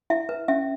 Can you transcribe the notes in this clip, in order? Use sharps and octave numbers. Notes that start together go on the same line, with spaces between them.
E4 E5
B4
C#4 E5